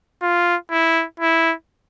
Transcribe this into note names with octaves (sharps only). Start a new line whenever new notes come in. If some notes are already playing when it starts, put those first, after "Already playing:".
F4
E4
E4